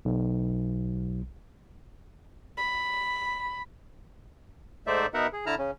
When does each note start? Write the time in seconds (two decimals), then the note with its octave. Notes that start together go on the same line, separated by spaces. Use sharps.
0.05 B1
2.58 B5
4.87 G#2 A3 D#4 C5 D5 E5
5.14 B2 B3 D#4 A#4 E5 F#5
5.33 G#4
5.46 D3 E4 A5 A#5 F6
5.58 C#3 C#4